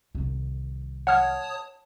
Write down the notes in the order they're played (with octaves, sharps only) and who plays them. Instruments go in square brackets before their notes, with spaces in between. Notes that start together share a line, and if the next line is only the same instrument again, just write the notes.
[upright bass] C2 D#3
[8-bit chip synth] C#5 A5 D#6 [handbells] F#5 F6 G#6